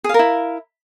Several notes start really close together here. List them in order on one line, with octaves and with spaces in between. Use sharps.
G#4 F5 A#4 E4